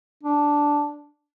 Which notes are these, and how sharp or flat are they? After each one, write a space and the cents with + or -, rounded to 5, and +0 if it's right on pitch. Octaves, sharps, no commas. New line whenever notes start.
D4 -5